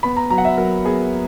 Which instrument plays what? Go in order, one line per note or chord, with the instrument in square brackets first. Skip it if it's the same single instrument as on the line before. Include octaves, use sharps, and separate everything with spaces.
[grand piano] B3 B5
A#5
F#3 A#5
F#5
E5
F#3 A#4
B3 G#4